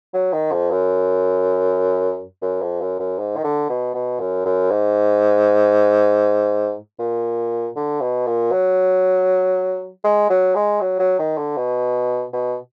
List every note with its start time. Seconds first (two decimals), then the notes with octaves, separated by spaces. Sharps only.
0.14 F#3
0.33 D#3
0.52 F2
0.71 F#2
2.42 F#2
2.62 F2
2.81 F#2
3.00 F#2
3.19 G#2
3.37 D#3
3.44 D3
3.69 B2
3.94 B2
4.20 F#2
4.45 F#2
4.71 G#2
6.99 A#2
7.76 D3
8.01 B2
8.27 A#2
8.52 F#3
10.04 G#3
10.30 F#3
10.55 G#3
10.81 F#3
10.99 F#3
11.19 D#3
11.38 D3
11.57 B2
12.33 B2